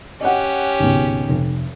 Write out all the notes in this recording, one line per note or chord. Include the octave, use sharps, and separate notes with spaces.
C#4 G4 D#5 F#5
G#1 C#2 B2
F1